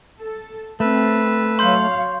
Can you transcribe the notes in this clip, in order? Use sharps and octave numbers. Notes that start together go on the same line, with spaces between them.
A4
A3 C4 B4 E6
F#3 C#5 F5 C6 G6